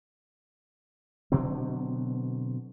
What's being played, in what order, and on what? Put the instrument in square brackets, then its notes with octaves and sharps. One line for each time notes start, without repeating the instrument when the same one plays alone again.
[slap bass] B2 D3 F#3 C4